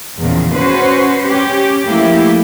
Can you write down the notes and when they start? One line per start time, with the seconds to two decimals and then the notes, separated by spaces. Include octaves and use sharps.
0.20 E2 A#2 C#3 F3
0.55 C#4 F#4 B4 C5
1.26 C#4 G4
1.87 F3 A3 A#3 E4 G4